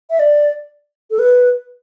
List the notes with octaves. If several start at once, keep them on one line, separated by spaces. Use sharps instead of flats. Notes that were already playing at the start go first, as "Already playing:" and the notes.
E5
D5
A4
B4